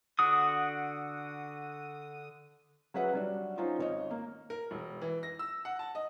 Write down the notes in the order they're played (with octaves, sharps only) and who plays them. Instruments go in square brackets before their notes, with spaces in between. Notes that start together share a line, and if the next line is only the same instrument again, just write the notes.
[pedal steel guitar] D3 F#4 D#6
[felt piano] F#3 C#4 G#4 B4 E5 F#5
F#3 G3 D4
C#4 D#4 F4 C5
G#1 C#5 D#5
A#3
[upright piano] A#4
E1
E3
A#6
E6
F#5
A5
D#5